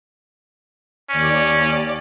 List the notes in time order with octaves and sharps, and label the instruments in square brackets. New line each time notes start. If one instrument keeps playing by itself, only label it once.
[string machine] D#2 D5 [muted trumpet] C#4